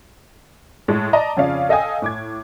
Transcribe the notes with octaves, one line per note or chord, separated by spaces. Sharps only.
A2 G#3
D5 D#5 A5 A#5
F2 C#3 C#4 D5 F5
A4 D#5 F5 G5 G#5 D#6
A2 D6 G#6